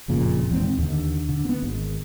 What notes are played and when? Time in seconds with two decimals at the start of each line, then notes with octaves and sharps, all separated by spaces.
0.08 F#1 F2 A#2 C#3
0.49 D#1 E2 G#2 C4
0.78 D#2 D3
1.29 D3
1.45 B3 C4
1.62 G#1